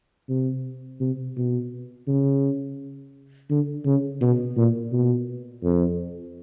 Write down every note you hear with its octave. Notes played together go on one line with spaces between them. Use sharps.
C3
C3
B2
C#3
D3
C#3
B2
A#2
B2
F2